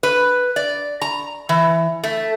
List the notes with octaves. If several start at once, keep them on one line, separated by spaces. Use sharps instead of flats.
B4
D5
A#5
E3
A3